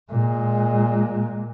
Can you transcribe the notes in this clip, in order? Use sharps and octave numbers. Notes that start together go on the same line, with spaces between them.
A#2 G#3